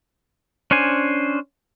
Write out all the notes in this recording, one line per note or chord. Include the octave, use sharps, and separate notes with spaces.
C#4 D4 C5 G#5